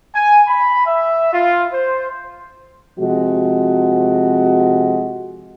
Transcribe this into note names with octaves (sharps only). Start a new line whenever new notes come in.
G#5
B5
E5
F4
C5
C3 F3 G#3 F#4